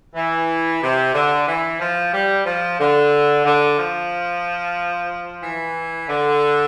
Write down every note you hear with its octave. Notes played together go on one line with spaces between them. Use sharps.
E3
C3
D3
E3
F3
G3
F3
D3
D3
F3
E3
D3